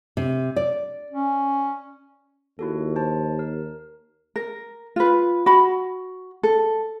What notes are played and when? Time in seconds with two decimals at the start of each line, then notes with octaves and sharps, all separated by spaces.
0.17 C3
0.56 D5
1.10 C#4
2.59 D#2 E4 F#4 A4
2.96 C5 A5
3.39 A#4
4.36 A#4
4.96 F4 B4
5.46 F#4 B5
6.43 A4